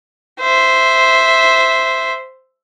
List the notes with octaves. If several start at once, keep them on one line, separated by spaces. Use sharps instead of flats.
C5 E5